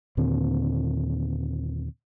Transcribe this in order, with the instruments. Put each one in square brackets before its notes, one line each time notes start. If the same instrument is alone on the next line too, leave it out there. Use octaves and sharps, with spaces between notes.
[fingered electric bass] D#2 A#2 D3 C4